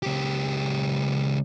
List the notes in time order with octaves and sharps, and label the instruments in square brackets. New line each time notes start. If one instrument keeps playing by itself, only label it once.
[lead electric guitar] C#2 G4